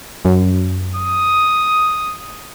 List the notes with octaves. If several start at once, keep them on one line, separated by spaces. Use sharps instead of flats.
F#2
D#6